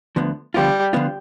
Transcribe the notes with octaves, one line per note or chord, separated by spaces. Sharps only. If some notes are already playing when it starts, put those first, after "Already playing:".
D2 D3 F3 B3
D3 F3 G3 B3 F4
D3 F3 B3 F4